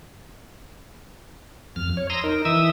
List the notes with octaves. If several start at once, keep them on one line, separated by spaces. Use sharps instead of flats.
F2 F6
C#5
A#5 C6 D#6 E6 A#6
D#4 A#4
E3 E5 D#6 E6